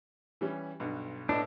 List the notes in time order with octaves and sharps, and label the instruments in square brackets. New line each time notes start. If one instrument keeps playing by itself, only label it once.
[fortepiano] E3 G3 C#4
B1 G2 B2
[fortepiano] A2 B3 D#5 [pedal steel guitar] D4